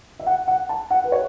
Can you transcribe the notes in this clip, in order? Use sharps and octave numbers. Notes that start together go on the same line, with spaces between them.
E5
F#5
F#5
A5
F#5
B4
C#5